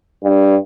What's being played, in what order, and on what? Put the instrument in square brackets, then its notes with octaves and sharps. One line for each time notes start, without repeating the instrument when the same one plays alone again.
[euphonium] G2